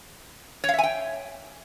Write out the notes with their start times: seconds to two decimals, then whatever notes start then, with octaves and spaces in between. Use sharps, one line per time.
0.64 C#5
0.69 F5
0.74 E5
0.78 G#5
0.83 G5